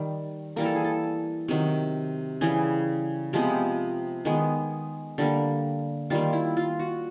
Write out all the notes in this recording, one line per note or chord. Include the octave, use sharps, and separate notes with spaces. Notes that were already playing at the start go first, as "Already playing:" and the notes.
Already playing: D#3 G3
E3 G3 A#3 A#4
A4
G#4
A4
C3 D#3 F#3
C#3 E3 G3 G#4
C3 F3 G#3 B3 G4
D#3 G#3 B3
D3 G3 A#3
D#3 G3 A#3 F4
E4
F4
F#4